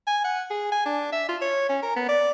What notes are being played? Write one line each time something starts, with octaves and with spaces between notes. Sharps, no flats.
G#5
F#5
G#4
G#5
D4
E5
F4
C#5
C#4
A#4
B3
D5